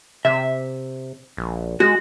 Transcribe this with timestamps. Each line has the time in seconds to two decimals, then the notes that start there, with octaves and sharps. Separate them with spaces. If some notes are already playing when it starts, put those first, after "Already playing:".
0.25 C3 E5
1.37 A#1
1.80 G#3 F#4